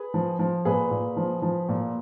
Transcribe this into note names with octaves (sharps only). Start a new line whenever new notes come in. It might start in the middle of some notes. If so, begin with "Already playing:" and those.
Already playing: G#4 B4
F3
F3
A#2 G#4 B4
A#2
F3
F3
A#2